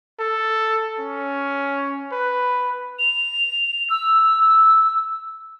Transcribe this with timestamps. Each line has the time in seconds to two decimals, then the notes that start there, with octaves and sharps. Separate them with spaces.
0.20 A4
1.00 C#4
2.12 B4
2.99 F7
3.90 E6